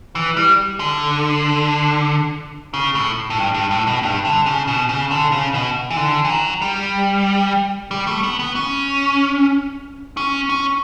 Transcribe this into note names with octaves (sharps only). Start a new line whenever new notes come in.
E3
G3
D3
C#3
A2
A2
G2
G2
A2
B2
G2
D3
C#3
B2
C#3
D3
C#3
B2
E3
D3
E3
F#3
G3
G3
A3
B3
B3
C#4
C#4
C#4